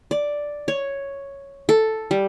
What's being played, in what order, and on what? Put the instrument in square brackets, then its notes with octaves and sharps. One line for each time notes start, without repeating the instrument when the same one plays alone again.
[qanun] D5
C#5
A4
G3